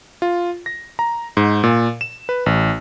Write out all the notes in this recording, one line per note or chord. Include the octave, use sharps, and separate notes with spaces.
F4
A#6
A#5
G#2
A#2
E7
B4
A1